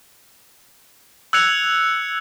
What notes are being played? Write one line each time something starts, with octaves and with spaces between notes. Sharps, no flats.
E6 F#6 G#6 C#7 F7